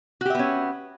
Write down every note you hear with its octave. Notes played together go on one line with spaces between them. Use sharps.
B3 C#4 F#4 G4 E5